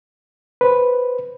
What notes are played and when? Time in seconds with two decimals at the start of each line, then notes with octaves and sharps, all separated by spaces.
0.61 B4 C5